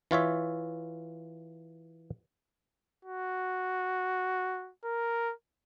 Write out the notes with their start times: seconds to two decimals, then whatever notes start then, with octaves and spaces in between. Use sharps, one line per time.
0.11 E3 F4 C#5 E5
3.05 F#4
4.85 A#4